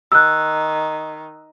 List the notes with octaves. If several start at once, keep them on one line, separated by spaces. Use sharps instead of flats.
D#3 E6 F#6